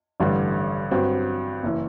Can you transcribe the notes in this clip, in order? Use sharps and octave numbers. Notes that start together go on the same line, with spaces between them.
A1 G2 D3 G3
G2 F#3 C4 F#4
F#1 E3